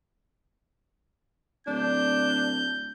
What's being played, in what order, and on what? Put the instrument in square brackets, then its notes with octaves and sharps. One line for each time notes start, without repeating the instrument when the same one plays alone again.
[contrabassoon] D1 [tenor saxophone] D4 [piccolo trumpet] G6